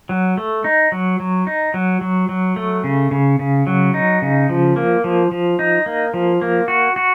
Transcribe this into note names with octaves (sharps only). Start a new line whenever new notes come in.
F#3
A3
D#4
F#3
F#3
D#4
F#3
F#3
F#3
A3
C#3
C#3
C#3
F#3
D#4
C#3
F3
A#3
F3
F3
D#4
A#3
F3
A#3
F#4
F#4